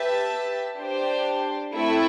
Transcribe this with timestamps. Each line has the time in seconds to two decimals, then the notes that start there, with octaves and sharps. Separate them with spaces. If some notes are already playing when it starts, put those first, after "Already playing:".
Already playing: G4 B4 E5 A5
0.77 D4 G4 C5
1.74 A3 C4 E4 A4 E5